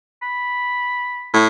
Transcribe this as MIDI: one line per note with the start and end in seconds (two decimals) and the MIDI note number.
0.22 1.41 83
1.33 1.47 45